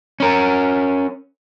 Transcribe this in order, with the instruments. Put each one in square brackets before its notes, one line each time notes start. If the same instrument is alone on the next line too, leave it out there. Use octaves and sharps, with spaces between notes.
[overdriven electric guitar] C#4 A#4